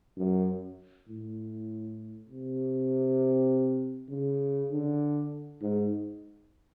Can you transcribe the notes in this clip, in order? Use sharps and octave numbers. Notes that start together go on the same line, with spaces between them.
F#2
A2
C3
C#3
D3
G#2